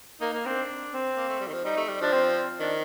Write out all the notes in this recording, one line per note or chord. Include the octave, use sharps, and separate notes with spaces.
A#3 D#4
A#3
C4 D4
C4
A#3
A3
G3
D#3
F3
G3 D#4
A3
G3
F3 D4
C4
D#3 D4